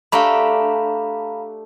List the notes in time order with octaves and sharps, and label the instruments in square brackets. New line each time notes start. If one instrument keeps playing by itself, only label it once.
[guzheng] A3 D4 G4 [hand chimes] F5 A#5 B5